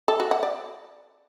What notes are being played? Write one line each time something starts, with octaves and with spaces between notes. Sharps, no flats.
A4
F#4
F#5
D5